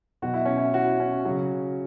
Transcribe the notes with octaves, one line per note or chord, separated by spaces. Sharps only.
B2 F#3 F#4
E4
C#4
E4
F#4
C#4
C#3 F#3